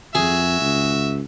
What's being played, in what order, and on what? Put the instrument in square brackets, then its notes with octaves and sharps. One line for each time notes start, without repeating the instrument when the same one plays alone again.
[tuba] F2 [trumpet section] F#4 E5 [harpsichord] G#4
[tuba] C#2